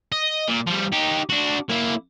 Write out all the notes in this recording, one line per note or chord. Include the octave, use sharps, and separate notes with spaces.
D#5
A#2
F3 G3
D#4 G4
D4 F#4
A#3 E4